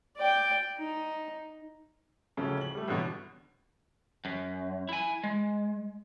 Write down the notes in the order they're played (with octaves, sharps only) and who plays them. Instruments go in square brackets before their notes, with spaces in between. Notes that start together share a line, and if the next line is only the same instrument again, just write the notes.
[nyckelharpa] D5 G5
D#4
[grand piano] D1 A#1 C#3 C#4 A4
F#7
G3 A3
A1 G2 B2 D3
[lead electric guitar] F#2
E4 G#5
G#3